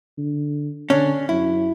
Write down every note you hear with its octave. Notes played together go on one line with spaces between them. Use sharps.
D3
D3 C#4 D4
F#2 E4